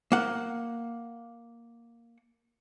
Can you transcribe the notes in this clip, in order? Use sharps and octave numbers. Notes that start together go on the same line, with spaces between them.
A#3 F#5